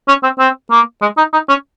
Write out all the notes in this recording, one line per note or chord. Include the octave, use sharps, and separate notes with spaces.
C#4
C4
C4
A#3
G#3
D#4
D#4
C#4